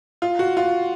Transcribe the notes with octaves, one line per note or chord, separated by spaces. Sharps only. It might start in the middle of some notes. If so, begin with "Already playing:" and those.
F4
F#4
F4